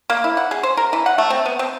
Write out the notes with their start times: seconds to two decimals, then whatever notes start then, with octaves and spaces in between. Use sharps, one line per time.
0.10 A#3
0.24 E4
0.37 F#5
0.51 G#4
0.63 C5
0.77 A#4
0.93 E3
1.06 F#5
1.18 A3
1.30 C4
1.46 B3
1.59 C4